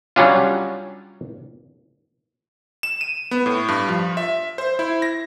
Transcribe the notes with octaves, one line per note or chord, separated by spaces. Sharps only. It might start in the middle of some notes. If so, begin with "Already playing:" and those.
F#3 G3 C#4 D4 F4
E7
D#7
B3
A2
G2
F3
E5
C5
E4
A#6